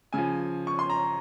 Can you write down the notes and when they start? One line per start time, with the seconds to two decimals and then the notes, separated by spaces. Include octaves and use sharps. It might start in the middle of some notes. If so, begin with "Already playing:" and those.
0.13 C#3 F3 G#5
0.67 C#6
0.79 C6
0.90 A#5